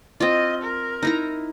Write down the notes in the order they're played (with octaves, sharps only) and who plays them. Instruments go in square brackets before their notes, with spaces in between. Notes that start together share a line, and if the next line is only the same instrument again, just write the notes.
[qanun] C4 F4 [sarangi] D#5
[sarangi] A#4
[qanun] D#4 E4 A#5